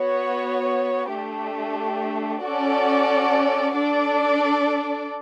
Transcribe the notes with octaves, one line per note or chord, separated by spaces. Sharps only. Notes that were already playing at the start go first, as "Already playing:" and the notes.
Already playing: B3 F#4 C#5
A3 D4 G4
C#4 F#4 A4 D5 F#5
D4 A4 D5